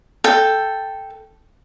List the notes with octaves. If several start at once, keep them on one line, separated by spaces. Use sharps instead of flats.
A4 G5